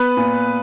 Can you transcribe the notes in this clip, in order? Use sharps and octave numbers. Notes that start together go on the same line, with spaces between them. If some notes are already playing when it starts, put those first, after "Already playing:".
Already playing: B3 B4 B5
A#2